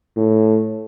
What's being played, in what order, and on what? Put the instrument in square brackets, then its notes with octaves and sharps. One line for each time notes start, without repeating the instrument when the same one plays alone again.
[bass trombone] A2